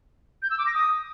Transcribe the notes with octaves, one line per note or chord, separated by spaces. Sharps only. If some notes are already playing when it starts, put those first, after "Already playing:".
G6
E6
D6
A#6
D#6